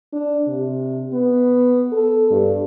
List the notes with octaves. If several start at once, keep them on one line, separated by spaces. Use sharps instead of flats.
D4
C3
B3
A4
G2